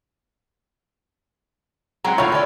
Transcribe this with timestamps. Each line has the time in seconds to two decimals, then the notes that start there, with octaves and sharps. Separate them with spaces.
2.04 F#3 G#3 C4 F#5 G5 A#5
2.18 A2 D3 F4 C#5 B5
2.32 A4 D5